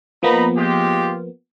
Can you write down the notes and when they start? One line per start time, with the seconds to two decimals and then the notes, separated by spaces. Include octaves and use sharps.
0.23 F3 A#3 B3 D#4 A#5 B5
0.56 G#3 F4 G4